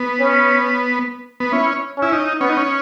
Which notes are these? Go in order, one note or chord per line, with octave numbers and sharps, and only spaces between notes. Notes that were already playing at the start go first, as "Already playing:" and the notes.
Already playing: B3
C#4
B3
C#4 E4
C#4 E4
D#4
B3 C#4
D#4
C#4